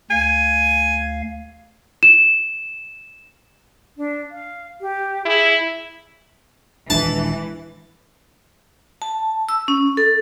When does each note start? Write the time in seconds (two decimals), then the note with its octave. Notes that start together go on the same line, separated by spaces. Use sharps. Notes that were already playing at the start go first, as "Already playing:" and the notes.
0.11 D2 F5 G#5
2.03 E7
3.97 D4
4.31 F5
4.81 G4
5.25 E4 G#4
6.90 D#1 E3 G#3 D4 A5
9.02 A5
9.49 E6
9.68 C#4
9.97 A4